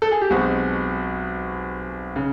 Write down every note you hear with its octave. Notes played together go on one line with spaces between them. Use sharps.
A4
G#4
G4
B1 B2 G#3 C4 F#4
C#3